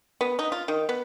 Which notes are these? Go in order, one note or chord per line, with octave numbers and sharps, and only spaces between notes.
B3
D#4
F4
D#3
B3